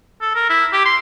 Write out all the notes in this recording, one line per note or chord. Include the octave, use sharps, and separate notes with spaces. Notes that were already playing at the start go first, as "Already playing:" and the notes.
A4
A#4
E4
G4
C6